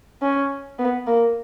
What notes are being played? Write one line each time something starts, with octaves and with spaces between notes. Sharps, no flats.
C#4
B3
A#3